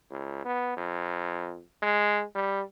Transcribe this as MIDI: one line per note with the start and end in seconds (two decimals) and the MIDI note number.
0.10 0.43 37
0.45 0.76 59
0.77 1.62 41
1.82 2.23 56
2.35 2.62 55